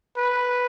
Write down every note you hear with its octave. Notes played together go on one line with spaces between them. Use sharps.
B4